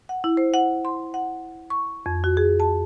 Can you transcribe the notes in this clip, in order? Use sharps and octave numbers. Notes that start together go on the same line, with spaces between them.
F#5
E4
C5
F#5
C6
F#5
C#6
F2
F#4
G#4
A5